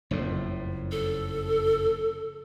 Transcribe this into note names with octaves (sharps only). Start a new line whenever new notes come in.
F#1 F2 A2
A4